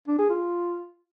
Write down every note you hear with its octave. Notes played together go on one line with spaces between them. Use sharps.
D4
G#4
F4